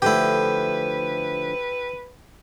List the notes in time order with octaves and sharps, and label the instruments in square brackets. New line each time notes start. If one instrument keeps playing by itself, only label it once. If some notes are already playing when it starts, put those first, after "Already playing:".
[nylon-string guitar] D3 F3 A3 [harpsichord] E4 G4 [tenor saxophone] B4